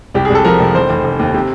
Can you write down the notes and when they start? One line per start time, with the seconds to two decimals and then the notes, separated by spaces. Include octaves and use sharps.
0.14 C2 G4
0.25 G#4
0.30 C2 A4
0.44 F3 A#4
0.60 C2
0.75 F1 C5
0.90 F1
1.04 F1
1.19 D#2
1.34 C3